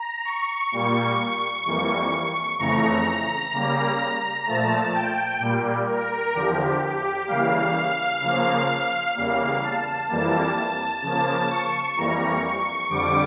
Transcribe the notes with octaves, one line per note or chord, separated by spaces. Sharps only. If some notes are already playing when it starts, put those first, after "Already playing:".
Already playing: A#5
C#6
A#2 G3 A#3
F2 E3 G3 A#3
F2 C#3 E3 A3 A#5
C#3 G3 A#3
A#2 F3 A3 A5
G5
A#2 G3 A#3
A#4
E2 D3 F3 G4
G4
C#3 E3 G3 A#3 F5
C#3 F3 A#3
E2 C#3 G3 A#3 F5
A5
F2 E3 G3 A#3
C#3 F3 A#3 A5
C#6
F2 E3 G3 A#3 A#5
C#6
C#6
F2 D3 G3 D6